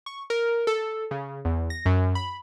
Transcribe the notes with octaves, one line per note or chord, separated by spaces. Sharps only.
C#6
A#4
A4
C#3
E2
A#6
F#2
B5